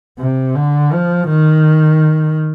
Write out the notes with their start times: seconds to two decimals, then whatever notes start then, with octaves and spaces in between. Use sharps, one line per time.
0.19 C3
0.55 D3
0.92 F3
1.29 D#3